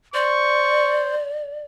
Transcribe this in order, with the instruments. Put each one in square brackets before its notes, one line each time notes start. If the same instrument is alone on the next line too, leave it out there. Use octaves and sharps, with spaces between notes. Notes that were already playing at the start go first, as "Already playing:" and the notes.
[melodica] C5 [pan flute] D5 [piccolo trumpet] C#6